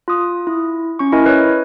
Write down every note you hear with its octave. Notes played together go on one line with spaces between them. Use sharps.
F4 D#6
E4
C#4 C#6
E4 A#4 D#5 G#5
B4 C#5